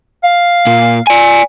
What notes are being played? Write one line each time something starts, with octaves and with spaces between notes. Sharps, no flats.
F5
A#2
D5 G#5